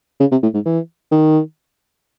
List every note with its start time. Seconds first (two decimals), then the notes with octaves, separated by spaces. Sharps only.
0.20 C#3
0.31 C3
0.42 A2
0.54 G#2
0.65 E3
1.11 D#3